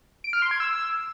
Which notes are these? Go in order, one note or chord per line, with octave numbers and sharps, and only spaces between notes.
D7
F6
C6
G#6
E6